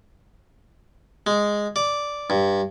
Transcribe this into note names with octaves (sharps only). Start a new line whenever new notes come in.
G#3
D5
G2